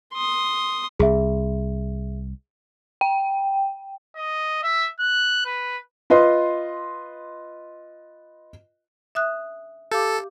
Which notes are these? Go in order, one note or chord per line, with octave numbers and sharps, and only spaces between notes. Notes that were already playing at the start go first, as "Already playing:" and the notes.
C6 D#6
C2 G#4 E5
G5
D#5
E5
F#6
B4
F4 B4 D#5 C6
E5 D#6 F#6
G4 A4 F5 D6